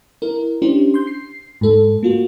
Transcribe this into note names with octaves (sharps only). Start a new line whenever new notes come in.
E4 A#4
C#4 D4 E4 G4 C5
C6 G6
C7
G#2 A4
A#3 F4 F#4